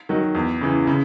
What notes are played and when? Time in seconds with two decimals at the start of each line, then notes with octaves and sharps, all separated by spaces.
0.09 D#3 F#3
0.35 E2
0.61 C#3 E3
0.87 C#3